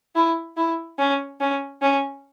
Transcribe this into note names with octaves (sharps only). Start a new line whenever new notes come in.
E4
E4
C#4
C#4
C#4